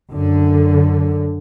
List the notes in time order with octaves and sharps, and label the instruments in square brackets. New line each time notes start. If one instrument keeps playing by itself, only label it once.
[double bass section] F#2 D3